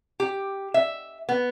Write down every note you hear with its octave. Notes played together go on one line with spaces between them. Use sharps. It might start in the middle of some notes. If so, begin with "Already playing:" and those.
G4
E5
B3